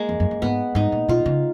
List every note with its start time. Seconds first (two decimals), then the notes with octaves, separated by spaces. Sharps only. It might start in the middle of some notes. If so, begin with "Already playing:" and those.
Already playing: G#3 A#3
0.09 F2
0.20 F#2
0.31 F#2
0.42 G#2 B3
0.75 G#2 D#4
0.92 A#2
1.08 B2 F4
1.26 C#3